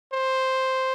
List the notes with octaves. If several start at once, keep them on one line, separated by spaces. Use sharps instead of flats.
C5